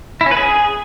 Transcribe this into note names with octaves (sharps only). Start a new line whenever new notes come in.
E4
C#4
B4
G#4